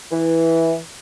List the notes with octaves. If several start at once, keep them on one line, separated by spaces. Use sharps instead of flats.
E3